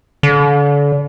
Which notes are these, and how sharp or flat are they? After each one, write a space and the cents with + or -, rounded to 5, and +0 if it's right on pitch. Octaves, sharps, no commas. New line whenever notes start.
D3 -35